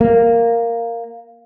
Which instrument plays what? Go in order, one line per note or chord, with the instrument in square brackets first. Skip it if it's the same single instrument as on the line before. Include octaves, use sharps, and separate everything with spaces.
[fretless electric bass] A#3